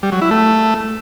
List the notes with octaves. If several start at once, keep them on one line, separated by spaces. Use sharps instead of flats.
G3
F#3
E4
A3